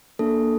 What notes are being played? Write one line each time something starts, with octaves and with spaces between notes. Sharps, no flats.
A#3 D4 A4